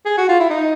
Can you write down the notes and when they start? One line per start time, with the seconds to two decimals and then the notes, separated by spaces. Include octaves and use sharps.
0.06 G#4
0.18 F#4
0.29 F4
0.40 E4
0.50 D#4